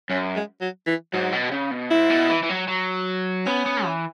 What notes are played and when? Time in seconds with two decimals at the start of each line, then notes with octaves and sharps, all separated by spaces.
0.09 F#2 C#4
0.36 G#3
0.61 F#3
0.87 E3
1.13 G#2 F#3
1.32 B2
1.52 C#3
1.71 B2
1.91 G#2 E4
2.10 B2
2.29 E3
2.43 E3
2.50 F#3
2.68 F#3
3.46 B3 C#4
3.66 B3
3.85 E3